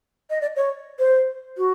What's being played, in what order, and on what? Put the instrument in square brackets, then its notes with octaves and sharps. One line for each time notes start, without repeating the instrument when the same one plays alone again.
[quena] D#5
D5
C#5
C5
F#4